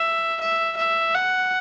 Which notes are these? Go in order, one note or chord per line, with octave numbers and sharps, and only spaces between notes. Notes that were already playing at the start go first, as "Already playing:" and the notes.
Already playing: E5
E5
E5
F#5